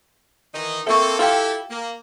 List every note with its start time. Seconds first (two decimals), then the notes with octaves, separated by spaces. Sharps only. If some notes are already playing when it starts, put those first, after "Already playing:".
0.53 D#3 E3 D#4
0.87 A#3 C4 A4 E5 C#6
1.19 E4 F4 G4 A4 G5
1.70 A#3